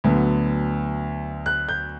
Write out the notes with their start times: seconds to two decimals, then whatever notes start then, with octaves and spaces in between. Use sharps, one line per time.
0.04 D2 D3 F#3 B3
1.46 F#6
1.69 G6